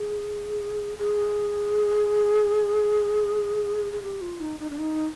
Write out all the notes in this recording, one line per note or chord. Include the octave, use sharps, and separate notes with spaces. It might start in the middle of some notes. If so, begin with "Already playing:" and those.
Already playing: G#4
G#4
G#4
G4
F4
D#4
D#4
D4
D#4